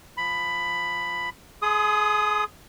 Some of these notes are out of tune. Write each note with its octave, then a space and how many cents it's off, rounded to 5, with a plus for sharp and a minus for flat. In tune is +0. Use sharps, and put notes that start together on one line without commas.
F3 +0 B5 +10
G#4 +30 C6 -25 D#6 +0